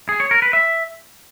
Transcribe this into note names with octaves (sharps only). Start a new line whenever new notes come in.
G#4
C#5
A#4
B4
E5